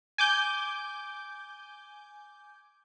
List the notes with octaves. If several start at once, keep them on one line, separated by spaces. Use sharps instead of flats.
G#5 D6 G6